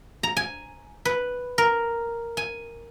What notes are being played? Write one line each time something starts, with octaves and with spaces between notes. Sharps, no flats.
A#5
G#5
B4
A#4
G#5